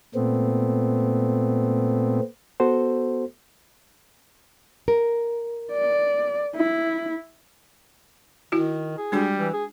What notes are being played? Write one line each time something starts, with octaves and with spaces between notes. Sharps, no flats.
A#2 A3 B3 C4
B3 F#4 A4 C5
A#4
D5
E4
D#3 E4 F#4
G#4
G3 G#3 D4 F#4
E3
G#4